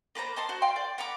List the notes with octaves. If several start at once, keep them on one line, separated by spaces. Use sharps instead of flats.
A#3 B4 C5 A#5
D#5 A5 C6
F#4 C5
F5 G5 C6
D5
F#5 A#5 B5 D6